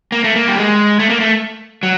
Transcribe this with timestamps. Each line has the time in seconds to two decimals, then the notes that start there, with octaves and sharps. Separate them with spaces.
0.12 A#3
0.24 A3
0.36 A#3
0.48 G3
0.58 G#3
0.99 A3
1.10 A#3
1.20 A3
1.83 F#3